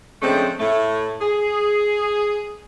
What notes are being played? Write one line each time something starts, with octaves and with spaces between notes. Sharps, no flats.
C#3 F3 G#3 A3 C4 D4
A2 A3
G#4